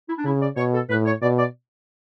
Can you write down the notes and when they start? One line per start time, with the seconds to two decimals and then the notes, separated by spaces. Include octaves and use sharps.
0.08 E4
0.18 D4
0.25 C#3 E4
0.41 D5
0.56 B2 C#5
0.73 A4
0.89 A2 B4
1.05 C#5
1.22 B2 D5
1.38 D5